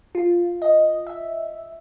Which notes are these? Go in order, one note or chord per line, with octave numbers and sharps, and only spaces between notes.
F4
D#5
E5